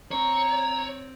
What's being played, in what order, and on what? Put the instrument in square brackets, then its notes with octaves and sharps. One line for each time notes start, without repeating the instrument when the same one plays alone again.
[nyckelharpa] C4 [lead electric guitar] C#5 [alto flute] A#5